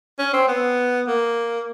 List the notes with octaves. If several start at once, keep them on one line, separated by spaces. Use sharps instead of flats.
C#4
C4
B3
A#3